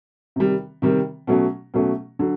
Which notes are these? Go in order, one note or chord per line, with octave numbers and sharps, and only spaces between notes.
C3 D#3 G3
C3 D#3 G3
B2 F#3 A3 C#4
B2 F#3 A3 C#4
D3 F#3